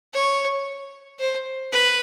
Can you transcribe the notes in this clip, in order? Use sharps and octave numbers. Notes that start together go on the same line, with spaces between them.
C#5
C5
B4